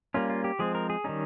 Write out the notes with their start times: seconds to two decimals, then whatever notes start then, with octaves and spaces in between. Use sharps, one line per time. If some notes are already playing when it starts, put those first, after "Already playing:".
0.14 G3 A#3 C#4 F4
0.30 F4
0.44 G4
0.59 F3 G#3 C4 G#4
0.75 A#4
0.90 G#4
1.04 D#3 G3 C#4 D#4